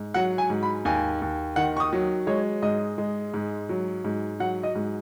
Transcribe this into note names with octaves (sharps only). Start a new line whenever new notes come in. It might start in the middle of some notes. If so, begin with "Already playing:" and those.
Already playing: G#2
F#3 F#5
G#5
G#2
B5
D#2 G#5
D#2
D#3 F#5
C#6
D#6
F#3
G#3 C#5
G#2 D#5
G#3
G#2
F#3
G#2
F#3 F#5
D#5
G#2